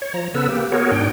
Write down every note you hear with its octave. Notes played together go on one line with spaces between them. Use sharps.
C#5
F3 A#5
C#3 B3 A4 B4 E6
A#3 G4
B3 F#4 G#4 A#4 C#5
G#2 D4 G5